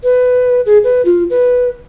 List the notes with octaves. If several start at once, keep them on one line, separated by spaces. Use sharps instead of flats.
B4
G#4
B4
F4
B4